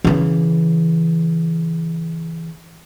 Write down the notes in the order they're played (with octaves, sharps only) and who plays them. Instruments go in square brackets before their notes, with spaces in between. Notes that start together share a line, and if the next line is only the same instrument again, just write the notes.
[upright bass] C#3 E3